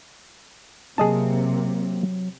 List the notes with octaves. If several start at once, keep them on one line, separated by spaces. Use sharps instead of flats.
C3 F#3 A#3 G#4 D#5 A5